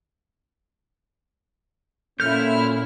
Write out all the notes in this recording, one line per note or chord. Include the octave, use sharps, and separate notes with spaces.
A#2 C#4 E4 A4 F6 G6